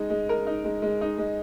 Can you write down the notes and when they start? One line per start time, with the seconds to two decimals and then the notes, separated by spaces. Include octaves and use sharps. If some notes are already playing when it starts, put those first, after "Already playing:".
Already playing: G#3 D#4
0.10 G#3
0.29 A#4
0.47 D#4
0.64 G#3
0.82 G#3
1.01 D#4
1.18 G#3